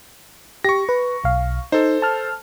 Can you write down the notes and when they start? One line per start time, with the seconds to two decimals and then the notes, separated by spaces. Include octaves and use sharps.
0.64 G4 C#6 A#6
0.89 B4
1.24 B1 F5
1.72 D#4 A4 C5
2.02 A5 F6